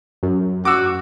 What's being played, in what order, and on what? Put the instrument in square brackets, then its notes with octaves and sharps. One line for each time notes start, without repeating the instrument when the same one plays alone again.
[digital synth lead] F#2
[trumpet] F#4 [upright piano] D6 E6